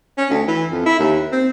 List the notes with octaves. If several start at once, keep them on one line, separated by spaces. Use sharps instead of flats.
C#4
D2
E3
F2
E4
D#2
C4